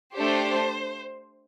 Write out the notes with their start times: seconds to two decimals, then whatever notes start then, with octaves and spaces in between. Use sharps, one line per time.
0.15 A3 D4 G4 C5